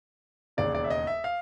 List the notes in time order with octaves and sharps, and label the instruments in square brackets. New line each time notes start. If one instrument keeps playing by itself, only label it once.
[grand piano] E1 D#2 C#3 D5
D5
E5
D#5
E5
F5